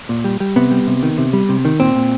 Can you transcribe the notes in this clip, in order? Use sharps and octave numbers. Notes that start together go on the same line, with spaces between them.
A#2
G3
G3
C3 B3
G3
C3
D#3
C3
G3
C3
D#3
A#2 C4
A#2